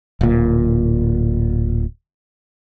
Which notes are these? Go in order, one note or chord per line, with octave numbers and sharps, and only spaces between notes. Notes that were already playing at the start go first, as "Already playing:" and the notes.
D1 A#2